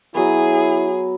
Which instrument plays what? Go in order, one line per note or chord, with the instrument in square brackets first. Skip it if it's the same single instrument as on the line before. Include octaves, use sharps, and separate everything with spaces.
[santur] F#3 B3 [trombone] E4 [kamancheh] G#4